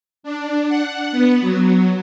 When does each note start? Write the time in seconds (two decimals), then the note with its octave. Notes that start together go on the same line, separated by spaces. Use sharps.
0.23 D4
0.68 F#5
1.11 B3
1.41 F#3